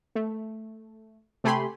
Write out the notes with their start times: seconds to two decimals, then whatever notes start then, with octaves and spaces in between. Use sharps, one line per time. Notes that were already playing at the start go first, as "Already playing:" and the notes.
0.15 A3
1.44 C3 A3 G4 G#5 B5 C6